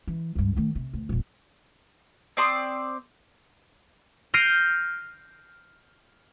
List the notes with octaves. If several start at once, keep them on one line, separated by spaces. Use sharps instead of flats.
E3
C#2 G2
D#3 A3
C3
D2
E1 A#1
C4 D5 C6 D#6
F6 G6 A#6 C7 D7 D#7